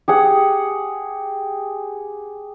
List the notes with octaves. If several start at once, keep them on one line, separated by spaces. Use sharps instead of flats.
G4 G#4 F#5